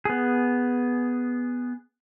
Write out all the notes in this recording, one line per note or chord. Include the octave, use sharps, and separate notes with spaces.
B3 G#4